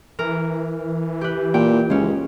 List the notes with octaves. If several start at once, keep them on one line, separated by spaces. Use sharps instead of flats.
E3 A#4
G4 B4
A#2 G5
C#2 G#3 C#4